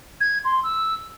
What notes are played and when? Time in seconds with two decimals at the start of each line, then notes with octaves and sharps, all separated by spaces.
0.21 G#6
0.45 C6
0.63 E6